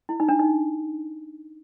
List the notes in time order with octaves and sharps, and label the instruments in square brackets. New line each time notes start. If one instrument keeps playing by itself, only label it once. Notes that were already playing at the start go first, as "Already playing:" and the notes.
[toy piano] E4
D#4
D4
D#4